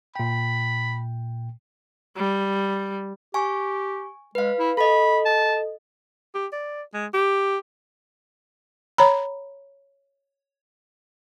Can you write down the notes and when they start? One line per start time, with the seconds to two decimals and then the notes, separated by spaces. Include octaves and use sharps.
0.15 A#2 G5 B5
2.17 G3
3.34 G4 G#5 C#6
4.35 G#3 B4 F5
4.59 E4
4.77 A4 D#5 B5
5.25 A5
6.34 G4
6.53 D5
6.94 G#3
7.14 G4
8.98 C#5 A#5 B5